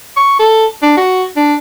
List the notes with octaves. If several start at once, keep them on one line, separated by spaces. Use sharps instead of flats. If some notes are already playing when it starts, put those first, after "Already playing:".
C#6
A4
D4
F#4
D4